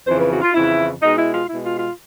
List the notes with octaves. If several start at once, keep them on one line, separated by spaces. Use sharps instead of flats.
F2 C#3 E3 C5
B4
F#4
F4
F2 C#3 E3 E4
B2 G#3 D#4
E4
F4
B2 G#3 E4
F4
F4